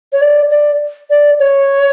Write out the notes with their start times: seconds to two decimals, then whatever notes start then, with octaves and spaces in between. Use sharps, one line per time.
0.13 C#5
0.22 D5
0.51 D5
1.10 D5
1.40 C#5